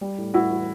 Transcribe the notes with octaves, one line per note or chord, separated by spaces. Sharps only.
G3
A2
A2 E4 F#4
E3